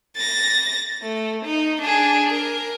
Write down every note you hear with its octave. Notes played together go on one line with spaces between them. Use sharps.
A6 A#6
A3
D#4
D4 G#4
A#4